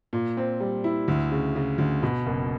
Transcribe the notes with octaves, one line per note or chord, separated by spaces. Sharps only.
A#2
C4
G3
E4
D2
C#3
C#3
D2
B2
F#1